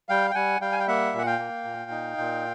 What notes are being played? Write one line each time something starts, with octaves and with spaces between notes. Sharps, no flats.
G3 F5 G5
G5
G3 F#5 G#5
G3 F5 G5
G#5
G5
A#3 E5 F#5
A#2 F#5
F5 G5
A#3
A#2
D#4
A#2